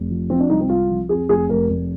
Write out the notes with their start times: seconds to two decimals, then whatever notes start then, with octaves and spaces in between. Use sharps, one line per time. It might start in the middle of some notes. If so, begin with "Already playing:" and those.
Already playing: F1
0.10 F3
0.30 F3 C4
0.40 D4
0.50 C2 D#4
0.61 C4
0.69 C2 F4
0.89 F3
1.09 F2 G#4
1.29 F1 G#4
1.49 F1 A#4
1.70 F1